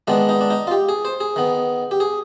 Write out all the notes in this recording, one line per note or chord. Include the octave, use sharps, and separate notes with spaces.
D#3 G#3 B3 D4
D#4
D4
D#4
F4
G4
G#4
C5
G#4
D#3 B3
G4
G#4